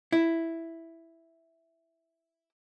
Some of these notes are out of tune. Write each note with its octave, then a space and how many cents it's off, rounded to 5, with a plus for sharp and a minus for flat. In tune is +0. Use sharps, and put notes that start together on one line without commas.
E4 +0